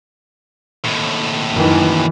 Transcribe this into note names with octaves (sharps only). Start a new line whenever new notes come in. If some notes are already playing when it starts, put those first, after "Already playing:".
D#2 A2
F#2 D#3 E3